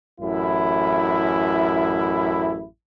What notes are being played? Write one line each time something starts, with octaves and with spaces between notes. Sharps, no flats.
A1 F#2 E4